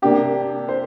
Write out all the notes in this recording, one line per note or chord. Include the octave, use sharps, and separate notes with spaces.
C3 A#3 D4 G4
C5